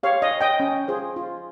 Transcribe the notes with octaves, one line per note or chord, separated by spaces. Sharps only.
G4 C#5 F5
D#5
C#5
D#5 G5
C#4
F4 G#4 C5
F4